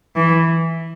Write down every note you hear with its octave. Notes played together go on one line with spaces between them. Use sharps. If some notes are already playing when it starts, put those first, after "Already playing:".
E3